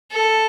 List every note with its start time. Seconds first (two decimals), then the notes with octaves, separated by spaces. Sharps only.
0.12 A4